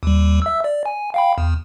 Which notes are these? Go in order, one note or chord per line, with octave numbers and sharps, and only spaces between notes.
D#2 G3
E5 E6
D5
G#5
F5 G5 B5
E2